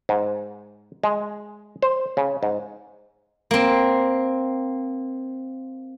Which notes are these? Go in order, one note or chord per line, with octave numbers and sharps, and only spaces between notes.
G#2
G#3
C5
C#3
G#2
A#3 C4